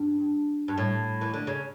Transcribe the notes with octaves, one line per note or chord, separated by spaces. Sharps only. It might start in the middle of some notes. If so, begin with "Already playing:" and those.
Already playing: G2
G2
A2
E3
D3
C#3